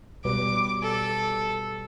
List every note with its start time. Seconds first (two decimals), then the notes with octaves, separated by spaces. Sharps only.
0.25 B2 G3 B4 D6
0.83 A4